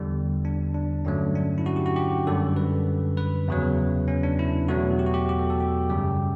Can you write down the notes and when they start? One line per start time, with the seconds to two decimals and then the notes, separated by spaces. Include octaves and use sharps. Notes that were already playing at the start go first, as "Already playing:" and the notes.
Already playing: E2 D3 G3
0.45 D4
0.75 D4
1.05 G2 D3 F#3 A3 C#4
1.35 D4
1.58 E4
1.66 F#4
1.76 G4
1.86 F#4
1.96 G4
2.27 F#2 D3 G3 A4
2.56 B4
3.17 B4
3.48 E2 C#3 F#3
4.08 C#4
4.23 D4
4.39 E4
4.68 E2 B2 F#3 A3 F#4
4.99 G4
5.06 F#4
5.14 G4
5.29 G4
5.39 A4
5.50 A4
5.60 G4
5.89 F#2 C#3 G3 G4